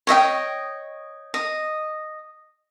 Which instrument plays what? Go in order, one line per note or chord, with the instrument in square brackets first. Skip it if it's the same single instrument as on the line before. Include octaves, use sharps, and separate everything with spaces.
[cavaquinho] C#5 D#5 E5 G5
D#5